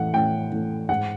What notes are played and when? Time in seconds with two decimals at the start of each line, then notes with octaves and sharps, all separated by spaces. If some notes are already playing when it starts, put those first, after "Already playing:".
Already playing: A2 E3 A3 F#5
0.14 A2 G5
0.52 E3 A3
0.89 G#2 F#5